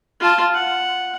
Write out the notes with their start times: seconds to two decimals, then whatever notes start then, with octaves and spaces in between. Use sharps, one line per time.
0.20 F4 A5
0.54 F#5